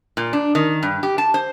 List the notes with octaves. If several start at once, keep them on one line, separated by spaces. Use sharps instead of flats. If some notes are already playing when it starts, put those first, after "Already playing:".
A#2
D4
D#3
G2
G4
A5
C5